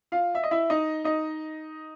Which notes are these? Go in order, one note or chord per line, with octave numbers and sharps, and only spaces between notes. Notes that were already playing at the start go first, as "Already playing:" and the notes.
F4 F5
E5
D#5
E4 E5
D#4 D#5
D#4 D#5